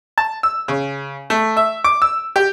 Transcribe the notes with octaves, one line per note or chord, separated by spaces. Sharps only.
A5
E6
C#3
A3
E5
D6
E6
G4